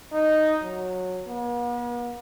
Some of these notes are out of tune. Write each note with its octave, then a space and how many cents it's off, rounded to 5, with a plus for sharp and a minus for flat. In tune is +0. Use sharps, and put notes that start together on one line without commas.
D#4 -5
F#3 -15
B3 -45